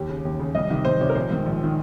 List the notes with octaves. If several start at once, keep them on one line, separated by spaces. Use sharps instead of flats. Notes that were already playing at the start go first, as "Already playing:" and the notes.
Already playing: D#2 G4
C#3
D#2
C#3
C2 D#5
C3 D#3
C2 C5
C3 D#3 C#5
A#4
A#1 C5
G#2 D#3
A#1
D#3